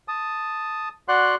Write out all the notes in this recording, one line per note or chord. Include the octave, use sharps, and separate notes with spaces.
A5 D#6
F#4 D5 F#5 C6 F#6